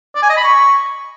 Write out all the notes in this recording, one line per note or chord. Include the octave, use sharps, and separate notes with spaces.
D5
G#5
D#5
B5
C#6